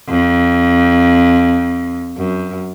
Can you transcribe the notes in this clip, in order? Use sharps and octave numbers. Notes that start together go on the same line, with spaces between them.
F2
F#2